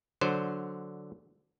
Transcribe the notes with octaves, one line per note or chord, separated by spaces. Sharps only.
D3 F#3 C5